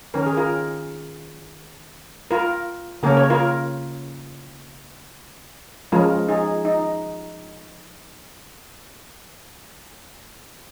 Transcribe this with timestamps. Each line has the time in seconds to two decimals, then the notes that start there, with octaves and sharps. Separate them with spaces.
0.14 D#3 C#4 A#4
0.26 G#4
0.37 F4 A#4
2.31 F4 A#4
3.03 C#3 A#3 C#4 A#4
3.17 C#5
3.30 F4 A#4
5.92 F3 G#3 C#4 F4 A#4
6.28 D#4 G#4
6.65 D#4